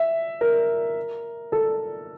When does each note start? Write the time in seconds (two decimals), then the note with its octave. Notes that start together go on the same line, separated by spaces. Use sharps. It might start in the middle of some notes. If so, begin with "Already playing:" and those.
Already playing: E5
0.41 A#4
1.52 A4